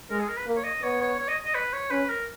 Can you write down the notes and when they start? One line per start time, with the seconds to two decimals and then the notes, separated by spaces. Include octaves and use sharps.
0.10 G#3 A#4
0.20 G#4
0.28 A#4
0.37 B4
0.46 A#3
0.57 C#5
0.64 D#5
0.82 B3 C#5
1.01 C#5
1.19 C#5
1.28 D#5
1.45 D#5
1.55 B4
1.73 C#5
1.91 C#4 B4
2.09 A#4